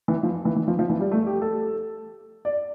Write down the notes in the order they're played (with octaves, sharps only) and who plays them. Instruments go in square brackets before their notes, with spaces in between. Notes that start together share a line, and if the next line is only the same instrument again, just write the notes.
[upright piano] E3
F3
E3
E3
F3
F3
E3
G3
A3
G4
A4
D5